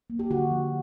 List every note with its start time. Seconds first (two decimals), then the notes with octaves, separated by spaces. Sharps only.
0.10 A#3
0.19 G4
0.30 D3 F#4
0.51 F3